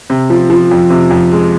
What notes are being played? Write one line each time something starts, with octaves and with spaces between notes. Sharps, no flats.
C3
F3
F3
F2
C3
F2
G#3